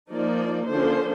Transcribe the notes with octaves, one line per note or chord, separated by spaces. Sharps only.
F3 A#3 D#4 D5
D3 F3 A#3 C#4 C5